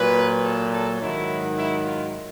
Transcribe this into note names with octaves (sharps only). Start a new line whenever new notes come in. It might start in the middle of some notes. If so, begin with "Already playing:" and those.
Already playing: A#2 F#3 B4
A4
A4
G#2 D#3 F#3 E4
E4
F4